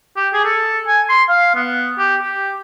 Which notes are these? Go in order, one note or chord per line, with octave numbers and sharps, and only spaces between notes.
G4
G#4
A4
G#5
C6
F5
B3
G4
G4